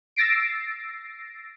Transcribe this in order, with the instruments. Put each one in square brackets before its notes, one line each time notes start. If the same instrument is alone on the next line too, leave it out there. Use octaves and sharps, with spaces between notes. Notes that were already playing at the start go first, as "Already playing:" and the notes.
[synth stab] E6 A6 A#6 C7 D7